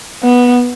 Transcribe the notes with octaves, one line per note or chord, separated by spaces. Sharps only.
B3